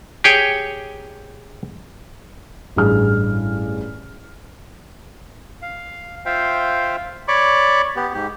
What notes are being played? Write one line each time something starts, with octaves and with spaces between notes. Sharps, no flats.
G4 G#4 C#5 G5
A1 G2 G#4 F6
F5
F4 C5 E5 F5 G5
C#5 D5 B5 C#6 D6
B3 G4
G#2 G4